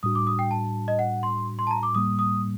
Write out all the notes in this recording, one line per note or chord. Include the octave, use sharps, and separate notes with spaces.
A2 G3 D4 F#4 D#6
D6
D#6
G5
A5
D#5
F#5
C6
C6
A5
A#5
D6
A2 G3 A#3 D#6
D#6